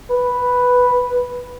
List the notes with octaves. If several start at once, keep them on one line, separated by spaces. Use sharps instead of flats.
B4